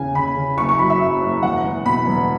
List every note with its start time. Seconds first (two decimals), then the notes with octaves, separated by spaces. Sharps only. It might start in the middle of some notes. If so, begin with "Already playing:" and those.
Already playing: E2 C#3 G#5
0.15 C#3 B5
0.36 C#3
0.57 F#1 C#6
0.69 C#6
0.79 F#3 B5
0.90 E5
1.00 F#2
1.22 F#1
1.43 E1 F#5
1.64 E2
1.86 B2 B5
2.07 E1